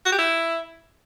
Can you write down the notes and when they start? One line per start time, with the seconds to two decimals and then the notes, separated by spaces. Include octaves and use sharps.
0.06 F#4
0.12 G4
0.18 E4